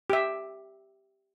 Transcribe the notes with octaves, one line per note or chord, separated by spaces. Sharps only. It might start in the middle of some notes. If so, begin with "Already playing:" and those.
G4 E5